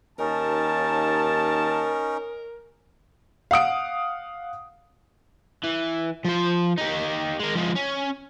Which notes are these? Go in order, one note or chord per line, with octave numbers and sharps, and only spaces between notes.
D#2 C#4 D#4 A#4 A5
F5 F#5 D#6 D7
E3
F3 C5
D#4 G4
G#3 A#4
F3 G#3
C#4